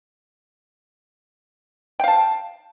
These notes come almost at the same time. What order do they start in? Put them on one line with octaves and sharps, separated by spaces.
G5 F5 A5